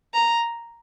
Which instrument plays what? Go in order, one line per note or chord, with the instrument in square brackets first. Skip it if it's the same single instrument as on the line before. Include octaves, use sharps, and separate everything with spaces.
[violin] A#5